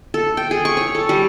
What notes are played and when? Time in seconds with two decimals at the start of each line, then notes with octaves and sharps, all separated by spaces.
0.14 A4
0.37 G5
0.51 G#4
0.65 C#6
0.77 C#5
0.95 A4
1.09 G3